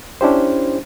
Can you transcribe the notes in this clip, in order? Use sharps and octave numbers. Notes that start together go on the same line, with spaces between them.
C#4 D4 E4 G4 C5